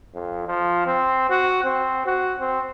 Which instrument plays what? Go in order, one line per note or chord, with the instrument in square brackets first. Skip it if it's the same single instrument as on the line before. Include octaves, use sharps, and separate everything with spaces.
[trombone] F2
F3
C4
F#4
C4
F#4
C4